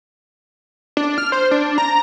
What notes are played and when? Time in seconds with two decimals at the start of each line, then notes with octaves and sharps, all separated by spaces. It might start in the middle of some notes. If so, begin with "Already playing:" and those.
0.97 D4
1.18 F6
1.32 C5
1.51 D4
1.78 A#5